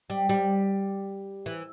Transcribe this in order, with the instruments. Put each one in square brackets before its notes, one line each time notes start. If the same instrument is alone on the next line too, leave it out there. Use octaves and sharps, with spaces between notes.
[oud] G3
G3
E3